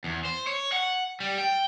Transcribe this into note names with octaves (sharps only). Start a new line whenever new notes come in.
E2
C5
C#5
F#5
G3
G5